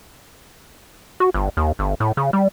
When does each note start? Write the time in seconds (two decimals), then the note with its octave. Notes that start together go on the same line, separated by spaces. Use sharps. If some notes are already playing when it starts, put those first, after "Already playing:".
1.20 F#4
1.34 G1
1.57 D#2
1.79 G1
2.00 A2
2.17 C#3
2.33 G3